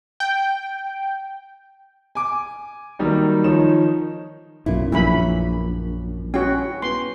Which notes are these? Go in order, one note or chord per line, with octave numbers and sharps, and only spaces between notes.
G5
G#5 D6
D#3 F#3 G3 A#3 D#4
D#3 F3 D#4 C#5 E7
B1 F#2 A#2 E4
A#1 F#2 A#3 C#4 E4 B5
C#4 E4 F#4 G5
B3 C6